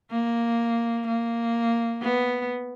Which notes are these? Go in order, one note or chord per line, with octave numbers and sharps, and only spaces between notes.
A#3
A#3
B3